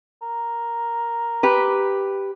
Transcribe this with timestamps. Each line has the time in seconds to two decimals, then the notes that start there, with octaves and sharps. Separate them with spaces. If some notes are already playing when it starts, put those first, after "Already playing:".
0.22 A#4
1.43 G4 B4